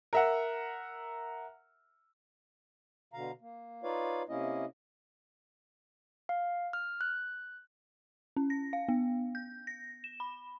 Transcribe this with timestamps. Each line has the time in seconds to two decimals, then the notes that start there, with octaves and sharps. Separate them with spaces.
0.13 A#4 E5 F#5
3.13 B2 D3 F5 A#5
3.41 A#3
3.83 D#4 F4 B4 C#5 D5 F5
4.29 C3 A#3 C#4 E4 D#5
6.29 F5
6.73 F6
7.01 F#6
8.36 C#4
8.50 A#6
8.73 F5
8.89 B3
9.35 G6
9.67 A#6
10.04 E7
10.20 B5